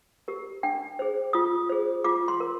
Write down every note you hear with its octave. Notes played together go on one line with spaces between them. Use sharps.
G4 A#4
D4 G5
G#4 C5
F4 D#6
G#4 C5
F4 D6
C6
A#4